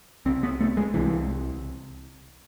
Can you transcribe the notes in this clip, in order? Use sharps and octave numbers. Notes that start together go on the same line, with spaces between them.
C2 C3 C4
B3
A3
G#3
C2 C3 E3